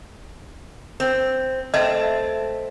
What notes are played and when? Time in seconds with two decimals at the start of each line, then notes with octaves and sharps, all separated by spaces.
1.00 C4
1.74 A3 C4 D#5